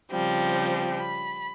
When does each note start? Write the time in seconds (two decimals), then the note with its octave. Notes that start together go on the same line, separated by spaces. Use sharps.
0.10 C#3 F3 G3 C4
1.00 B5